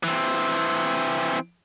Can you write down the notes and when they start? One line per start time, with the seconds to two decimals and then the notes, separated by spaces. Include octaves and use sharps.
0.03 E3 C4